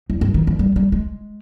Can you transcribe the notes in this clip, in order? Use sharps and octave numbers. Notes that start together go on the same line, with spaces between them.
E2
G2
D#3
E3
G3
G3
G#3